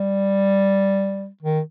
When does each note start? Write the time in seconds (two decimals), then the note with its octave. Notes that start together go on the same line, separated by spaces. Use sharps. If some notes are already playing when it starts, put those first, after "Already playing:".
Already playing: G3
1.42 D#3